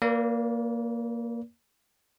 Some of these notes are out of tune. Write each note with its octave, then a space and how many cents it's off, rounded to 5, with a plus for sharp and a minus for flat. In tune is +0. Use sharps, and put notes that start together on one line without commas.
A#3 +0 B4 -45 D5 -30